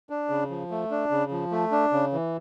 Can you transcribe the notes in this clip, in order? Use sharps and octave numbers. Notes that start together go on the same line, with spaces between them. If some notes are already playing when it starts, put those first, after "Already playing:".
D4
C#3
F3
A3
D4
C#3
F3
A3
D4
C#3
E3